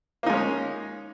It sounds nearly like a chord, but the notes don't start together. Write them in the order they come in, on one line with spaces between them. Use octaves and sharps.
A#3 D#4 G#3 C#4